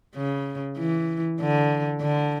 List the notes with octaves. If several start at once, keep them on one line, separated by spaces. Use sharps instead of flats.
C#3
E3
D3
D3